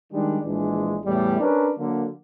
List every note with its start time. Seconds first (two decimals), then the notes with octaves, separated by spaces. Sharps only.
0.12 D#3 G3 G#3 D4
0.43 A#1 E3 G#3 D4
1.04 E2 A2 E3 G3
1.40 C#4 D4 A#4 B4
1.78 D3 F#3 A#3